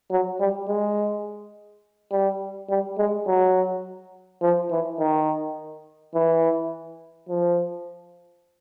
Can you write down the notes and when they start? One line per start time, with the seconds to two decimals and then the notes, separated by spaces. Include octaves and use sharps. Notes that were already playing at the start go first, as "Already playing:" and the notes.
0.11 F#3
0.40 G3
0.68 G#3
2.11 G3
2.70 G3
2.98 G#3
3.27 F#3
4.42 F3
4.71 E3
4.99 D#3
6.15 E3
7.29 F3